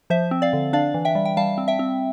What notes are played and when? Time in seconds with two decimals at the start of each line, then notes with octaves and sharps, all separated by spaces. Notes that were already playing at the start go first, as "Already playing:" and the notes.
0.10 F3 C5 E5
0.31 C4
0.42 D5 F5
0.53 D3
0.73 D4 D5 F5
0.94 E3
1.05 E5 G5
1.15 G3
1.25 G5
1.37 G3 F5 A5
1.58 C4
1.68 E5 G5
1.79 C4